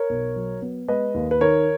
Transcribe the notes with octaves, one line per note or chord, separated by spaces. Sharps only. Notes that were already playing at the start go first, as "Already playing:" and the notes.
Already playing: A#4 C#5
B1
F#3
B3
G#3 B4 D#5
D#2
B4
D#3 A#4 C#5